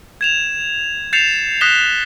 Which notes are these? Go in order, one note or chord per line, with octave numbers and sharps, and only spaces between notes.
G#6 E7 F7
G6 A6 C7 C#7 E7 F7
D#6 F#6 A#6 B6 E7 G7